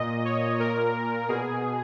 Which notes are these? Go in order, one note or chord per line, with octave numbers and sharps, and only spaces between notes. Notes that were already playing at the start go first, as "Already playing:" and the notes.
Already playing: A#2 D#5
C#5
A#2 A#4
B2 G#4